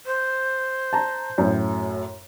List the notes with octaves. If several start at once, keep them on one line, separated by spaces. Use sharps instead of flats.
C5
A5 A#5
F#2 A2